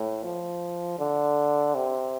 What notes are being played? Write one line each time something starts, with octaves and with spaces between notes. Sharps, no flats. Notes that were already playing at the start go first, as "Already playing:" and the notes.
Already playing: A2
F3
D3
C3